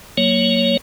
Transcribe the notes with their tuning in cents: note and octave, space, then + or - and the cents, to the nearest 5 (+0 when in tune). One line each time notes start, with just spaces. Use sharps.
F#3 +0 A#3 +0 C#5 +0